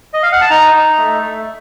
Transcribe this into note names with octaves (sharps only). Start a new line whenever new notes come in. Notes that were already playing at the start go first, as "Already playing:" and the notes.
D#5
F5
F#5
A5
D#4 A#5
D#4
A3
A3